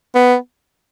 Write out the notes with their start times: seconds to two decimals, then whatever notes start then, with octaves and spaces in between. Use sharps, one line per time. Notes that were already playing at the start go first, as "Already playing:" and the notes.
0.15 B3